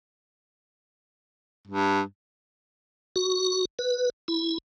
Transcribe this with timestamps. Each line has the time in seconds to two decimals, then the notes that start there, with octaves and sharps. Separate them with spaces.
1.68 G2
3.16 F#4
3.79 B4
4.28 E4